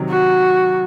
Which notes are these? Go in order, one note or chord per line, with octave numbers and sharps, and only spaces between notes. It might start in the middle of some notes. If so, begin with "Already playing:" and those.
Already playing: C3 D#3 F#3
F#4